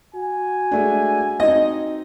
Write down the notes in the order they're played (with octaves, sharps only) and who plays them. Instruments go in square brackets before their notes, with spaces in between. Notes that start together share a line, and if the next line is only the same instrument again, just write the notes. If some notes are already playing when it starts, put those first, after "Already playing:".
[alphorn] F#4 [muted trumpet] G#5
[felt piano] G#3 A3 D4
[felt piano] C4 D#4 [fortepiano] D#5